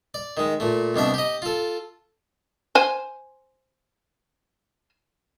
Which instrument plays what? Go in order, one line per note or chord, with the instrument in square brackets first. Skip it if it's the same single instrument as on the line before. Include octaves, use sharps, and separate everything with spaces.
[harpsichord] D5
D#3 G#3
A#2 A3
C2 B2 D4 E5
G4 D#5
F4 A4
[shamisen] C5 G#5